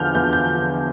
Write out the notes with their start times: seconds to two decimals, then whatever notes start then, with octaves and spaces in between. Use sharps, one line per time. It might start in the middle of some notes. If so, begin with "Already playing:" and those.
Already playing: E2 D3 F3 F6 G6
0.15 E2 G6
0.33 G6